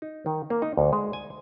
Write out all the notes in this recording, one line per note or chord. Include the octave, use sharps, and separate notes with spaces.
D#4
D#3
A#3
D#4
D2
G#3
G#5